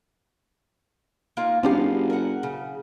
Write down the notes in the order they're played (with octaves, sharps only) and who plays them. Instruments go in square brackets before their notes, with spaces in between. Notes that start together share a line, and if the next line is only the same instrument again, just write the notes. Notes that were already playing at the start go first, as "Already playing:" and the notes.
[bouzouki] A#3 D#4 F4
[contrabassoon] F#1 [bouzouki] B3 F5 [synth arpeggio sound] C4 D4 G4
[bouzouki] A#4 F#5
C#3